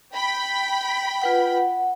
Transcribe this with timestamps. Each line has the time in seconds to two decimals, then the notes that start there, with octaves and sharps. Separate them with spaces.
0.14 G5 B5
1.22 F4 B4 F#5
1.57 F#5